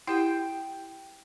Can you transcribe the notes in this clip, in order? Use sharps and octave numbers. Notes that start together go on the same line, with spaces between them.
E4 G4 F#5 G5